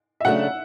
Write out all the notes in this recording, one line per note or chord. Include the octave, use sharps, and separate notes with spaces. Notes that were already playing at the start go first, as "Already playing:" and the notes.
E5
C#3 F#3 A3 D4 F#5